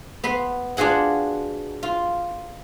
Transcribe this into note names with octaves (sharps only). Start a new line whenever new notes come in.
B3 B5 C6
D4 F4 F#4 G#4 F#5
F4